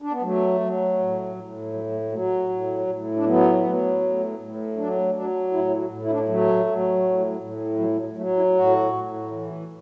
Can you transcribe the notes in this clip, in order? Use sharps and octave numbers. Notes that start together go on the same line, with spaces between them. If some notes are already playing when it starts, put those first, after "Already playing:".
D4
B3
F#3 A3
F#3
A2
A2
F#3
A3
F#3 A3
A2
A2
D4
F#3 B3
F#3
A2
A2
F#3 D4
F#3 D4
A2 E4
F#4
A2
E4
D4
E4
F#3 A3
F#3
A2
A2
F#3
F#3
F#3 A3
E4
A2 F#4
A2
E3